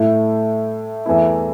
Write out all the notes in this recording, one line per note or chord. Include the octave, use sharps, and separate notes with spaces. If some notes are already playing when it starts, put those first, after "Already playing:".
Already playing: A2 A3 E4
E2 E3 A3 E4